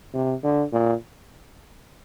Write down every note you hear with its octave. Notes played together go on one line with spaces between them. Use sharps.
C3
D3
A#2